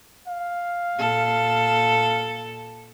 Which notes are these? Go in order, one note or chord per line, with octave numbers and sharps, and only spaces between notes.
F5
A#2 A4